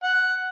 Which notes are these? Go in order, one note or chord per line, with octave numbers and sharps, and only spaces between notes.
F#5